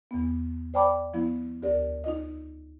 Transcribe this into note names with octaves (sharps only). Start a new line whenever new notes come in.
E2 B3
C5 D5 G5 A5 B5 D6
F3 B3 E4
D2 G4 A#4 D5
D#4 F4 D#5